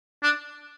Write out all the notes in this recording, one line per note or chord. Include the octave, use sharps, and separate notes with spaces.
D4